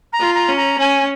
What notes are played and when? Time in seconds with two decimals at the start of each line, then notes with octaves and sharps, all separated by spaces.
0.12 A#5
0.20 F4
0.34 A#5
0.49 C#4
0.56 A#5
0.79 C#4 G#5